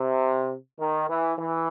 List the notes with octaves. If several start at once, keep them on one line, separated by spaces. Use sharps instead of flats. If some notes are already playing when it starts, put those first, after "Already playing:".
Already playing: C3
D#3
E3
E3